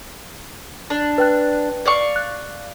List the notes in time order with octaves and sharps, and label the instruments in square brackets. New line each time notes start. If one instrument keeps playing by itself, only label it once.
[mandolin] D4
[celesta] B4 G5 F#6
[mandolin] D5 F5 C#6
[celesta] F#6